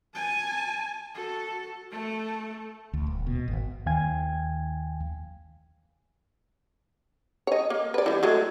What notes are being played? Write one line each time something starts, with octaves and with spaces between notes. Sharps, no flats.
G#5 A5
F#4 A4
A3 A4
D2
D#1
B2
G#1
D#2 D#3 F5 G5 G#5 G#6
C#5 D#5
A#3
B4 D5
E3 G3
F#3 G#3 A3